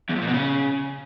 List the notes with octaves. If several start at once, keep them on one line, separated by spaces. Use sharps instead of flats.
E2
F2
A#2
B2
C#3